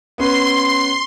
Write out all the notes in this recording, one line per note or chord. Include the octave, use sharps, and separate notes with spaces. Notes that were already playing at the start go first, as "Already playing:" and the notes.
B3 C#4 B4 C6